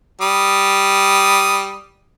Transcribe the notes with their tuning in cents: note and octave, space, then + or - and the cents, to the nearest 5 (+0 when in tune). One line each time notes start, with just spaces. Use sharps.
G3 +0 D#6 +0